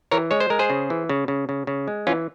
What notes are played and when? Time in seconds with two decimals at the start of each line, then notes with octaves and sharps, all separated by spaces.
0.11 E3 A#4 C#5
0.31 G#3 C#5
0.40 C5
0.50 G#3 A#4
0.59 G#4 C5
0.70 C#3
0.90 E3
1.09 C#3
1.28 C#3
1.49 C#3
1.67 C#3
1.88 G#3
2.07 E3 C#4 F4